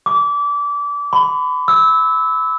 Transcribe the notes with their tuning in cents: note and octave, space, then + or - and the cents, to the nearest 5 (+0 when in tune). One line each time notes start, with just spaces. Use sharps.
D6 -25
B5 +30
E6 -20